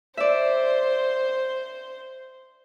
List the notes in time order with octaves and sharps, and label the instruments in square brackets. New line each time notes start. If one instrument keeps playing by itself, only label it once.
[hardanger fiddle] C5 [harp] D5 E5